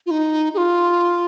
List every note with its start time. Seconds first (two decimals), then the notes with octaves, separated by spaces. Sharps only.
0.06 F4
0.11 D#4
0.54 G#4
0.58 F4